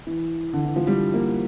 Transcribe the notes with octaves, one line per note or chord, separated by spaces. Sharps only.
E3
D3
E3
F3
G3
A#3